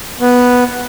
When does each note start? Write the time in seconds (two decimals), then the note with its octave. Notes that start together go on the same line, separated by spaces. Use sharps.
0.20 B3